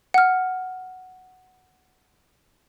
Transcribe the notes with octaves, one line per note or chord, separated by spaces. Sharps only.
F#5 F6